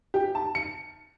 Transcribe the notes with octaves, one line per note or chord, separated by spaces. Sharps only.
G4
A5
C#7